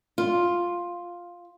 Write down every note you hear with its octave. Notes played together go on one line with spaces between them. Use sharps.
F4